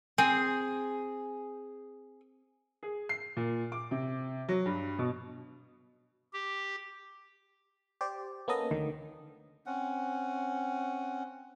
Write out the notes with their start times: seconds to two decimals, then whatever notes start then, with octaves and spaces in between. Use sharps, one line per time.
0.18 C4 G#4
2.83 G#4
3.09 C7
3.37 A#2
3.72 D6
3.91 C3
4.48 F#3
4.66 G2
4.99 B2
6.33 G4
8.01 G4 C5 D5
8.48 A#3 B3 C#4 A4 D#5
8.71 D2 D3 D#3
9.66 C4 C#4 F#5